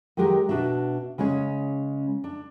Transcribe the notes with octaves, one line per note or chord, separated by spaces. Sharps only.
D#3 F#3 G#3 G4 A#4
B2 D4 F#4 E5
C#3 G#3 C#4 C#5
D4